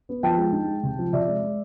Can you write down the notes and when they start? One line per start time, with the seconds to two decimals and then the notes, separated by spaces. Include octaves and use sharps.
0.09 B3
0.23 F3 G5 A5
0.38 G#3
0.53 D#4
0.68 G#3
0.83 C3
0.99 F3
1.13 C3 D5 E5
1.27 G#3
1.43 G#3